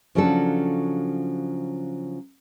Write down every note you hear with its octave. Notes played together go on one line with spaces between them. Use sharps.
C#3 F3 F#3 D4 F#4 A4